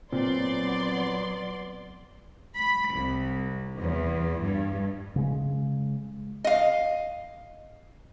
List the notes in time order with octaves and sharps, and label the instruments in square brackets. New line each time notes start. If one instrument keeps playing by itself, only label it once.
[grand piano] A#2 [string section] F#3 D5 C6 [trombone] B3 [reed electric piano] C4
[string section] B5
C2
E2
G2
[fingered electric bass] C#3 G#3
[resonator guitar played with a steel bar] D#5 F5